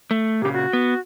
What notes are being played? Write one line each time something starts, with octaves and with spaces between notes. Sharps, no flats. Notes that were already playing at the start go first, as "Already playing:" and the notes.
A3
A#2 C#3 G4
F#4
B3